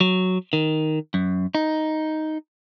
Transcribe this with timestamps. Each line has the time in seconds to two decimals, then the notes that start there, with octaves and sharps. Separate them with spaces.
0.01 F#3
0.53 D#3
1.14 F#2
1.55 D#4